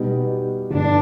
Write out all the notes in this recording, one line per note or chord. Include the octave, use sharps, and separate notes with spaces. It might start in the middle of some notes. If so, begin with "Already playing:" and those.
Already playing: B2 G3 B3 D#4 G4
G1 G2 D3 G3 D4